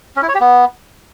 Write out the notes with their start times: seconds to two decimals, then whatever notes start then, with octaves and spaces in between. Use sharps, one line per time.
0.16 C#4
0.22 E4
0.28 C#5
0.34 G4
0.41 B3